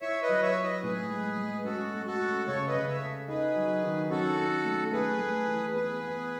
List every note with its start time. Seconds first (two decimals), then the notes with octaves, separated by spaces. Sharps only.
0.01 E4 C#5 E5
0.22 B4 D#5
0.29 F#3
0.42 C#5 E5
0.56 E4
0.63 B4 D#5
0.83 A2 G#4 B4
1.11 G#3
1.38 G#3
1.65 C#4 F#4 A4
1.93 A3
2.06 F#4 A4
2.20 C#4
2.47 C#3 A4 C#5
2.67 B4 D#5
2.74 C#3
2.88 C#5 E5
3.02 A4
3.28 D#4 G#4 B4
3.56 F#3
3.84 D#3
4.10 C#4 F#4 A4
4.38 C#4
4.65 A3
4.92 A3 G#4 B4
5.19 A3
5.47 E3
5.74 B3 G#4 B4
6.01 B3